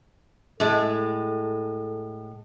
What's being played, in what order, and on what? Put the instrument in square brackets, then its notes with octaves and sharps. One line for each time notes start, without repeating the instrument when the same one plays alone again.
[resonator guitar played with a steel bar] A2 G#3 [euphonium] A4